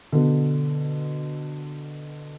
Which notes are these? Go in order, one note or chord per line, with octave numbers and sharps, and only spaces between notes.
B2 D3